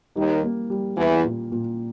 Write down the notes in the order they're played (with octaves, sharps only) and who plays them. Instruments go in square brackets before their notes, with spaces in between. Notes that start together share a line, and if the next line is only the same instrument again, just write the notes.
[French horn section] D#2 D#3 [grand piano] G3
[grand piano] A#3
G3
[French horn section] E2 E3 [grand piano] G3
[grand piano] A#2
A#2